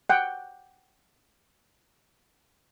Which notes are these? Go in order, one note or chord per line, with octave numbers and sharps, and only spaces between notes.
F#5 G5